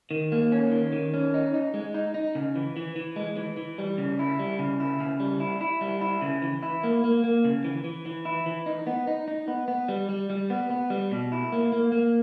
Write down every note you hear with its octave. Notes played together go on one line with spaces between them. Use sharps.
D#3
A#3
C#4
D#3
D#3
C#4
D#4
D#4
G#3
D#4
D#4
C#3
E3
E3
E3
G#3
E3
E3
G3
C#3
E4
G3
C#3
E4
C#3
G3
E4
E4
G3
E4
C#3
E3
E4
A#3
A#3
A#3
C#3
E3
E3
E3
E4
E3
D#4
B3
D#4
D#4
B3
B3
G3
G3
G3
B3
B3
G3
B2
E4
A#3
A#3
A#3